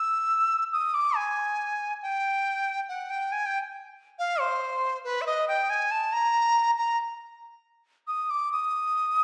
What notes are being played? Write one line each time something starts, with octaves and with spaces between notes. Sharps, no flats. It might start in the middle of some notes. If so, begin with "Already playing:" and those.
Already playing: E6
D#6
D6
G#5
G5
F#5
G5
G#5
G5
F5
C5
B4
E5
D#5
G5
G#5
A5
A#5
A#5
D#6
D6
D#6